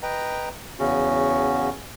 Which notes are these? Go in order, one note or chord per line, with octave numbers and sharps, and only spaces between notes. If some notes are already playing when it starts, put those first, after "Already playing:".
B4 D#5 G5 A#5
E2 C#3 C#4 F#4